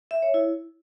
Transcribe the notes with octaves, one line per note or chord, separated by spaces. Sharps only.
E5
C#5
E4